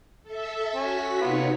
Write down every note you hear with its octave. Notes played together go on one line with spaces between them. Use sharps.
A4 E5
C#4 F#4 B6
C3 B3 D#4 F4 C#5